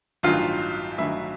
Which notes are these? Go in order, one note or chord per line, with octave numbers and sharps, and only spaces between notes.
A1 G2 D#3 F#3 F4 F5
A1 G2 D#3 F#3 E4 E5